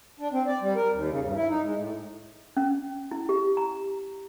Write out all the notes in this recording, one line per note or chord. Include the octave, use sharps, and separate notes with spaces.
D4
C4
D5
G3
A#4
D#2
C#3
G2
E4
D#4
G#3
A2
C#4
E4
G4
A#5